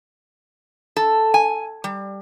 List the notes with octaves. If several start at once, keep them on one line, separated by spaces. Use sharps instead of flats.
A4
G#5
G3